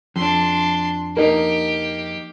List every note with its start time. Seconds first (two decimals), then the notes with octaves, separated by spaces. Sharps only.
0.16 F2 D4 C6
1.17 A#3 D#4 G4 A#4